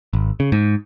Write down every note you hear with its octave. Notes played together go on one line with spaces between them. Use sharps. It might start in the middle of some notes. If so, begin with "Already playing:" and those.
G#1
C#3
G#2